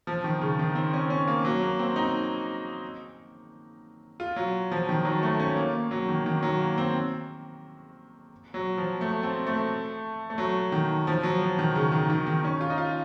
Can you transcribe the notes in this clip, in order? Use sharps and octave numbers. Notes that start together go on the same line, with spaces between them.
F3
D#3
C#3
D#3
C4
C#4
C#4
A#3
F#3
A#3
C4
D#4
F4
F#3
F3
D#3
F#3
A3
C#4
A#3
F#3
D#3
D#3
F#3
A#3
C4
F#3
F3
A3
C4
A3
A3
F#3
D#3
F3
F#3
F3
D#3
C#3
D#3
D#3
D#3
C#4
F4
D#4
F4